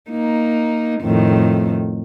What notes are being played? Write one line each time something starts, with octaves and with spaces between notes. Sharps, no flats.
A#3 D#4
F2 A2 D#3